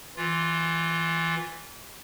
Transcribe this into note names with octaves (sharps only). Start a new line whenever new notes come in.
E3 F4